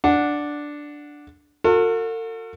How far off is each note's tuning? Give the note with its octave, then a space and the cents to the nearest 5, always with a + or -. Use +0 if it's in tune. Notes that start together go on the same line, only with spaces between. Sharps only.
D4 +0 F#5 -10
F#4 -40 A4 +45